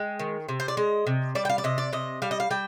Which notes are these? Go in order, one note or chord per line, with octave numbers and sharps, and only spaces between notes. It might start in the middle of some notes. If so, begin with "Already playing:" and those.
Already playing: G#3 G5
D#3
C3
C5
D5
G#3 D#5
C3
G3 D5
G5
F5
D5
C3 D#5
D5
C3 D#5
G3 F5
D#5
F5
G3 G5